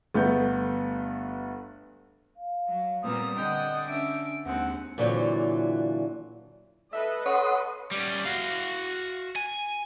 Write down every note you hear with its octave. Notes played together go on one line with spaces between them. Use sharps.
G1 A3 B3 G6
F5
F#3
A#2 G3 B3 C4 D#6
D3 D#5 F#5 G5
C#4 D4 E5 D7
D#2 G#3 C4 D4 F#5
A#2 D3 E3 F#3 C4
A4 B4 D#5 E5
C#5 F#5 C6 D#6
G3 C#4
F#4 F5
G#5